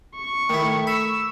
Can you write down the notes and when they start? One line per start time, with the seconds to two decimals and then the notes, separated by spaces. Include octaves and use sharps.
0.15 C#6
0.50 D#3 A3 E4
0.87 B5 E6